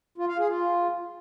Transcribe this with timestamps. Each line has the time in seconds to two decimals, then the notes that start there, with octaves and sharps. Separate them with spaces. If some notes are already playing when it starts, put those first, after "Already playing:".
0.18 F4
0.28 F5
0.39 G#4
0.49 F4